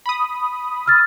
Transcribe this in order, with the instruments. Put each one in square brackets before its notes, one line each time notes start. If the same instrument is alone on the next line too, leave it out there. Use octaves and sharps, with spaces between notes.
[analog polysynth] B5 D#6
[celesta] E6 F6 A6